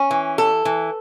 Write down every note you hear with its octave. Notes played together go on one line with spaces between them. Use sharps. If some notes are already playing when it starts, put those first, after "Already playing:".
Already playing: C#4
E3
A4
E3